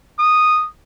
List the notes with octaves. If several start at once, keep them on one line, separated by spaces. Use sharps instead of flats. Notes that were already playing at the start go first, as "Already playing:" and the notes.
D#6